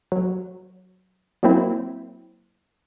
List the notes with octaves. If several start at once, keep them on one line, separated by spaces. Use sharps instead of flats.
F#3
F#3 A#3 C4 E4